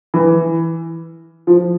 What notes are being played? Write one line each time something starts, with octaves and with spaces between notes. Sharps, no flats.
E3
F3